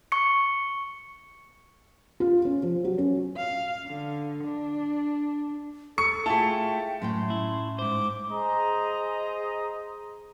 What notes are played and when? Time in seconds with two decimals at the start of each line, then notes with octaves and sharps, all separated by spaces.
0.12 C#6 C#7
2.20 F4
2.45 C#4
2.63 F3
2.84 F#3
2.98 C#4
3.37 F5
3.87 D3
4.44 D4
5.98 A4 C#6 C#7
6.26 A3 E4 F4 G#4 G5 A5
7.02 F#2 A2 C#4 G5 C6
7.30 E4
7.79 G#2 C5 D6
8.30 G#4 C5 D#5 A#5